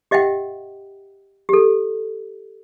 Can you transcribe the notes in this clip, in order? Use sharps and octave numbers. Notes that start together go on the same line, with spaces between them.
G4 D#5 E5 F#5 G5
G4 A4